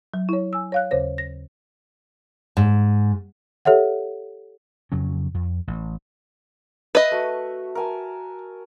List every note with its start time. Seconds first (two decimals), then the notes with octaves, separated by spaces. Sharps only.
0.14 F#3
0.29 E4 C#5
0.53 G#5 E6
0.72 C#5 F5 F#6
0.91 D#2 C#3 C5 C#5 A#6
1.18 A#6
2.57 G#2
3.65 G4 A4 C#5 E5 F#5
4.92 F2 C#3 F#3 C#4
5.34 F2
5.67 A1
6.95 B4 D#5 E5
7.11 A3 F#4
7.75 A#4 G#5 A5